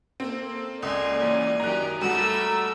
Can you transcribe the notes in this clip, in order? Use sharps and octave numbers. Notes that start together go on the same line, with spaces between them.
A#3 C4 A4
C#2 D5 G#5 C6
E3 A#3 C#4 G#5
F#2 D#3 G4 A#5 F#6
G3 A3 F#4 A4 B4 A#5 E6